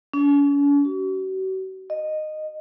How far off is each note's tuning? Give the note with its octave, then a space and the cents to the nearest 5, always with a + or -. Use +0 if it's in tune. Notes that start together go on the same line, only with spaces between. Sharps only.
C#4 +45
F#4 +40
D#5 -10